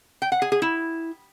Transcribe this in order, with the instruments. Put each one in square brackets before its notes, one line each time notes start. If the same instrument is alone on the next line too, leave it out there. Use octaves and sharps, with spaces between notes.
[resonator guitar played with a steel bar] G5
F#5
G#4
G#4
E4